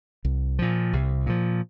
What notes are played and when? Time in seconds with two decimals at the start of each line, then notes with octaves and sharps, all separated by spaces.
0.25 C2
0.59 A#2 F3
0.93 C2
1.26 A#2 F3